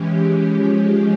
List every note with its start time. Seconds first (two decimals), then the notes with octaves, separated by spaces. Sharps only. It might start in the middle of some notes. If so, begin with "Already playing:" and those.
Already playing: E3 G#3 C#4 G4
0.52 F3 G#3 C#4